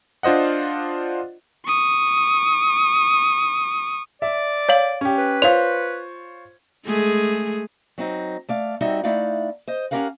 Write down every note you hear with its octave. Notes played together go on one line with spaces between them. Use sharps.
D4 F4 C5 D#5 F#5
C#6 D#6
D5 E5
C#5 F5 F#7
C#4 G4
B4
F4 C5 C#5 F5 F7
G#3 A3 G#4
F#3 C4 D#4
A3 D5 F5
G3 C4 D#4 F#4 C#5 E5
A3 D#4 E4 D5 F5 F#5
C5 D#5
C#4 F4 G4 A#4 F5 F#5